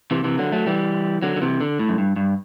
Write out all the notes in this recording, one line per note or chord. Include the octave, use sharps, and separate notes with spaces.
C3 E3
C3 E3
D3 F#3
F#3 A3
E3 G3
D3 F#3
D3
C3 E3
D3
A2
F#2
G2
G2